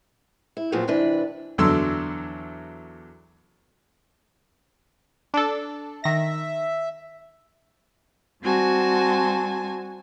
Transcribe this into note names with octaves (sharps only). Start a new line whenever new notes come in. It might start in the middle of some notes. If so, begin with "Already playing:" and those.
E4
A#2 F3 F#3 B3 C4
C3 E3 D4 B4
E2 D3 F#3 A4 C6 E6
D4 A4
D#3 E5 A#6
G3 C4 F#4 G#5 A5